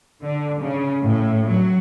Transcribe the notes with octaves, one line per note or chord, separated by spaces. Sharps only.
D3
C#3
A2
F#3